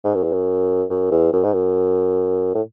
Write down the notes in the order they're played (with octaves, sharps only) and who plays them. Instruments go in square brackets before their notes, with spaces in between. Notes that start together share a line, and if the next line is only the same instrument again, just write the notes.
[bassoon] G#2
F#2
E2
F#2
F#2
E2
F#2
G#2
F#2
A2